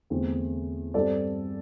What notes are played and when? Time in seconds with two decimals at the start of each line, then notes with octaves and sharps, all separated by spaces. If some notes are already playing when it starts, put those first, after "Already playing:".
0.10 E2 D3 A3 C4
0.94 G2 G3 C4 A4 D5